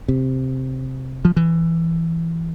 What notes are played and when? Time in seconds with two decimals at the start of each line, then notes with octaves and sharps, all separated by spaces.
0.08 C3
1.25 F3
1.37 E3